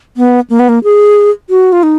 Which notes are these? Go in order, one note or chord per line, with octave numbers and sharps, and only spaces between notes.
B3
A#3
B3
A#3
G#4
F#4
F4
D#4